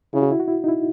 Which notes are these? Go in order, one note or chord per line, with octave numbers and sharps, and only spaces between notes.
C#3 E4
F#4
E4
F#4
E4
D#4
E4